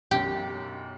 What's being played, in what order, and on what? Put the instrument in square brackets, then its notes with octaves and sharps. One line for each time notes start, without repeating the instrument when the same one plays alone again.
[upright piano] B1 F#2 [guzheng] G4